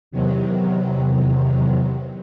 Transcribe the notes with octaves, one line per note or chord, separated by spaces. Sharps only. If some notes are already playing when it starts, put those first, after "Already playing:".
E2 C3 D#3 F#3